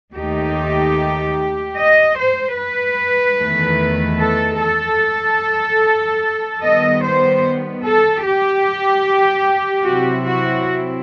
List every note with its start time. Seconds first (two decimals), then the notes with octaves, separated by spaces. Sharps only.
0.15 D#2 D#3 A3 D#4 G4
1.77 D#5
2.17 C5
2.57 B4
3.38 E2 D#3 A3
4.20 A4
4.60 A4
6.62 D#3 G3 B3 D#5
7.02 C5
7.84 A4
8.25 G4
9.85 C3 F#3 C4 E4 F#4
10.25 F#4